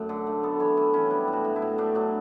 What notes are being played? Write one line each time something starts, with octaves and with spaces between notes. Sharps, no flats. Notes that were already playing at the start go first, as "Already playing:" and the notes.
Already playing: F#2 A3
D3
A3
B3 A4
E3 C#5
E3 E4
E3 C#4
G3 D4
A2
F#4
A2
E4
A2
A3 D4
F#3 D4